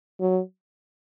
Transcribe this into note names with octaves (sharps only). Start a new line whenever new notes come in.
F#3